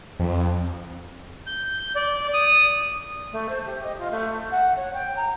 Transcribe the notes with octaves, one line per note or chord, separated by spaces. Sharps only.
F2
G6
D5
D#6
A3
C5
G4
D#5
F4
A3
F#5
C#5
G5
A#5